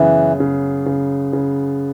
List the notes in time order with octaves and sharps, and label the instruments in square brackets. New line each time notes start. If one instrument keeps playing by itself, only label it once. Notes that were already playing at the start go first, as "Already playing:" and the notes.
Already playing: [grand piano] F#2 C#3 B3 [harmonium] E3
[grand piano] C#3
C#3
C#3